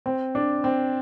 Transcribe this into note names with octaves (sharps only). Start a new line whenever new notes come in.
C4
D4
C4